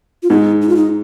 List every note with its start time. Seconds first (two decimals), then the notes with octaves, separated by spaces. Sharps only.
0.23 F4
0.30 G#2 D#4
0.62 D#4
0.69 F4
0.76 D#4